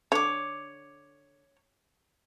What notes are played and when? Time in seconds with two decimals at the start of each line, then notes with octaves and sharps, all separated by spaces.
0.12 D3 C#5 D6